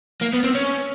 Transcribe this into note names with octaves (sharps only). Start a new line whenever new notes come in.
A#3
B3
C4
C#4